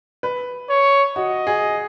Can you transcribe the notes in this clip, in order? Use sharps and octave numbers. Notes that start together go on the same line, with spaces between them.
B4
C#5
F#4 D#5
G#4